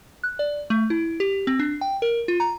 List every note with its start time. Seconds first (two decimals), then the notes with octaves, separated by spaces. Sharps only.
0.24 F#6
0.39 D5
0.70 A3
0.90 E4
1.20 G4
1.47 C4
1.59 D4
1.81 G5
2.02 A#4
2.28 F4
2.40 A#5